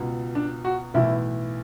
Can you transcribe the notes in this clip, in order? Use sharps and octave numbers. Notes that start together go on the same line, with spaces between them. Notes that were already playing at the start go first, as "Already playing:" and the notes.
Already playing: C#2 B2
D4
F#4
B1 A2 E3 E4